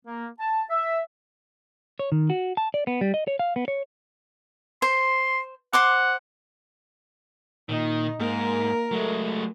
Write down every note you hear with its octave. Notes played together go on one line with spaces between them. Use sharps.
A#3
A5
E5
C#5
D#3
F#4
A5
D5
B3
G3
D#5
C#5
F5
B3
C#5
C5 C6
C5 F#5 C6 D6
A#2 D#3 D#4
G#2 A#3 A#4
F#3 G#3 A3